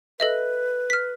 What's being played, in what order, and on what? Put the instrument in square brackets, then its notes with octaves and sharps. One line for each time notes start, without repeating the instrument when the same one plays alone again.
[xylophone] A4 D#5 E5 [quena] B4
[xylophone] F6 B6